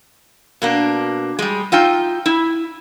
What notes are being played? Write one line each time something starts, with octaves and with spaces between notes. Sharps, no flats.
B2 A#3 D4
G3 G#3
D#4 F4 E5 G5
E4